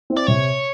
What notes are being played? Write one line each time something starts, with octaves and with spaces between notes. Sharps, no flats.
C4 E4
D5
C3 C#5